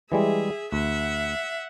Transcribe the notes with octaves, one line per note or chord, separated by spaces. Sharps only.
E3 G3 G#3 G#4 E5
D2 E5 F#5